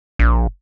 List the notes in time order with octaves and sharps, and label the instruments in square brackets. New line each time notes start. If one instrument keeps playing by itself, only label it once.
[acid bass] A#1